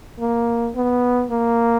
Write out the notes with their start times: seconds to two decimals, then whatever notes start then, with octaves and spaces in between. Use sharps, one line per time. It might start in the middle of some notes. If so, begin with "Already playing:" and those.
0.20 A#3
0.76 B3
1.30 A#3